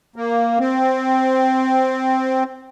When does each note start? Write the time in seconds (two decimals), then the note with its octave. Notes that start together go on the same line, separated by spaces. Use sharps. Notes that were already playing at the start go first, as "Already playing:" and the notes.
0.16 A#3
0.59 C4